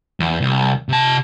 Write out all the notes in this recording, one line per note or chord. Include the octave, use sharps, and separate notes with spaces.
E2
C2
C3 A5